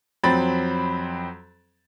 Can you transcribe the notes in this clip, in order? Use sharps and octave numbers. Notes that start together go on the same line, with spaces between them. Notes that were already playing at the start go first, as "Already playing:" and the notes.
F2 F#3 C4 B5 A6